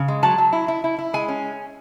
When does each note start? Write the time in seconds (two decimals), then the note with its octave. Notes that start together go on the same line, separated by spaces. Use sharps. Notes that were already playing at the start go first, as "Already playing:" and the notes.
Already playing: C#3
0.08 G#3
0.23 F#3 A5
0.38 F#3
0.53 E4
0.68 E4
0.84 E4
0.99 E4
1.13 G#3 G#5
1.28 C#4